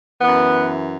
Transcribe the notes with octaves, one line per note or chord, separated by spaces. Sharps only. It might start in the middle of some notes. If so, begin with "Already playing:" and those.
F#2 E3 B3